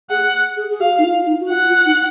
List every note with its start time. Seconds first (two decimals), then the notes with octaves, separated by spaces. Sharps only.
0.10 G#4 F#5
0.57 G#4
0.70 G#4
0.80 F#4 F5
0.98 D#4
1.04 F4
1.23 F4
1.27 D#4
1.40 F#4
1.50 F4 F#5
1.68 F4
1.85 D#4